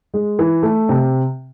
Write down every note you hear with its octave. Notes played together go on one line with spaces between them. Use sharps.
G#3
E3
A3
C3